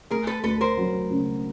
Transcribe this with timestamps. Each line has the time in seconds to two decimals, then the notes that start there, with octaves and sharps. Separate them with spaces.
0.11 A3 G#4 A#4
0.27 A4 B4
0.43 D2 A4 B4
0.61 A#4 C5
0.77 F#3
1.11 C#3